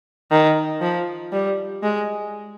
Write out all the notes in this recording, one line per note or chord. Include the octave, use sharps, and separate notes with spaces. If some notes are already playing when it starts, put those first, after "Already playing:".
D#3
F3
G3
G#3